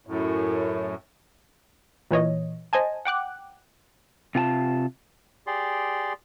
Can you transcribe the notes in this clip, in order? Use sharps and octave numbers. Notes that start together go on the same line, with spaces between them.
F#2 A2
A#2 E3 C#5 D#5
C5 D#5 G#5 A5
F#5 G5 D6 F#6
C3 F4 G#5 A5
G4 G#4 D5 C6